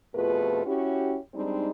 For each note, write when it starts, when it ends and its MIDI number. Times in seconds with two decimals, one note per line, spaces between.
0.15 0.62 41
0.15 0.62 47
0.15 0.62 57
0.15 0.62 65
0.15 0.62 68
0.15 0.62 71
0.66 1.18 61
0.66 1.18 64
0.66 1.18 66
0.66 1.18 67
1.34 1.71 55
1.34 1.71 56
1.34 1.71 60
1.34 1.71 62
1.34 1.71 63